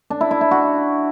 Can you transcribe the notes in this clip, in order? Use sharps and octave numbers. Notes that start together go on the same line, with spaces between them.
D4
E4
E4
E4
F#4